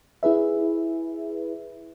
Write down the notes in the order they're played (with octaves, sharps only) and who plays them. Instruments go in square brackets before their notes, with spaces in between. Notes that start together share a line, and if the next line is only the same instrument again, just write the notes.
[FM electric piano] E4 G#4 B4 E5